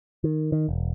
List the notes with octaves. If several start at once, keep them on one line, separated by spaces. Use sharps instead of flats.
D#3
D#3
E1